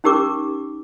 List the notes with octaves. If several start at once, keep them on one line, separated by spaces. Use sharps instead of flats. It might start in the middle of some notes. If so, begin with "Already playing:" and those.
C#4 D#4 G4 A#4 D6